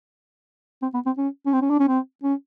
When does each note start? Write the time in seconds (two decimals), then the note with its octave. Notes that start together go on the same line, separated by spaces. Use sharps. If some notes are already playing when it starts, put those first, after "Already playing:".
0.82 C4
0.94 B3
1.06 C4
1.18 C#4
1.46 C#4
1.53 C4
1.62 C#4
1.70 D4
1.80 C#4
1.88 C4
2.23 C#4